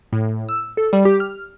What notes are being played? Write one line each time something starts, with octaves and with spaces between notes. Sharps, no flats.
A2
E6
A4
G3
G4
F6